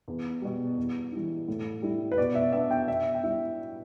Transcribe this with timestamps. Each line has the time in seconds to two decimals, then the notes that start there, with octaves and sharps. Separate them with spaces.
0.08 E2
0.42 B2 G3
0.78 E2
1.12 E3 G3 E4
1.48 A2
1.82 G3 E4
2.12 B4
2.18 B2 D5
2.35 E5
2.53 B3 D4 E5
2.71 G5
2.88 B2 E5
3.14 G5
3.23 G3 E4 E5